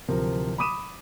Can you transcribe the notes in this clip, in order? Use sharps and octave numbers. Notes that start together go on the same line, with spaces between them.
D1 C3 F3 A#4
B5 D6 D#6 D#7 E7